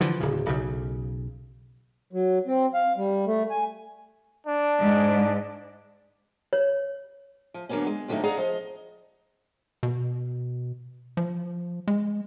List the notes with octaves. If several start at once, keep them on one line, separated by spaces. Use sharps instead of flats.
D3 E3 F3
D1 C#3
B1 C#3
F#3
C4
F5
G3
A3
G#5
D4
G#2
C#5
F3
D3 F#3 G3 A#3 B3 C#4
G#3
G2 D3 F3 F#3 A3 D#4
G#4 D5 D#5 F5 F#5 A#5
F3 D#5
B2
F3
G#3